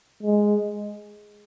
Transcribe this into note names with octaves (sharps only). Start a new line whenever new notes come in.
G#3